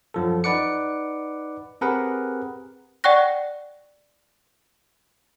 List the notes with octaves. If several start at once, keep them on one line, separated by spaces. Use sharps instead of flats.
F#2 F3 A4
D#4 B4 D5 F#5 D6 C#7
C4 G4 G#4 A#4 B4 F#5
D5 F#5 G5 C#6 F#6 A#6